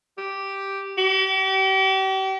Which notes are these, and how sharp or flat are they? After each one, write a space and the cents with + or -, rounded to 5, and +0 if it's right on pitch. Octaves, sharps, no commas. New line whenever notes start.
G4 -5
G4 -40